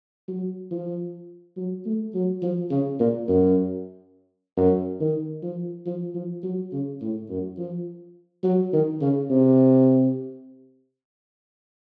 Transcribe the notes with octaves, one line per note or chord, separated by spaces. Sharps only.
F#3
F3
F#3
A3
F#3
F3
C#3
A#2
F#2
F#2
D#3
F3
F3
F3
F#3
C#3
A2
F#2
F3
F#3
D#3
C#3
C3